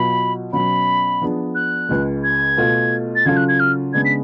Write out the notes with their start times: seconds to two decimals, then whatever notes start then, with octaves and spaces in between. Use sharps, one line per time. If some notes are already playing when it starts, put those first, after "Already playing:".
Already playing: B2 F#3 B3 F4 B5
0.53 B2 F#3 C#4 B5
1.21 F3 B3 D4 G#4
1.55 F#6
1.89 C#2 C#3 G#3
2.24 G#6
2.57 B2 A3 F4
3.16 A6
3.25 C#3 F#3 C#4 F4 A4 G#6
3.37 F#6
3.48 G#6
3.60 F6
3.93 C#3 G#3 B3 D4 G#6
4.05 B6